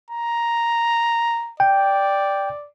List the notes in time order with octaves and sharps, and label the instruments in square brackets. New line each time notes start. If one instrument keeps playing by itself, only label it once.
[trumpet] A#5
[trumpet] D5 [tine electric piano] G5